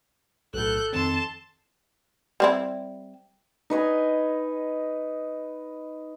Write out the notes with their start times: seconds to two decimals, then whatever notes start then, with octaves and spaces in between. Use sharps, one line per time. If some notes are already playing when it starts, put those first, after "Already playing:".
0.54 B1 A2 A4 F#6 G6
0.93 F2 D#3 C4 A5 C6
2.40 G3 C4 E4
3.70 D#4 B4 D#5 G#5